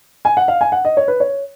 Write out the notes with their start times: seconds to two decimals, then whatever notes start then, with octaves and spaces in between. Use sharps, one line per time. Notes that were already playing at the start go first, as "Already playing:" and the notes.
0.25 G#5
0.37 F#5
0.48 F5
0.61 G#5
0.72 F#5
0.85 D#5
0.97 C#5
1.08 B4
1.20 C#5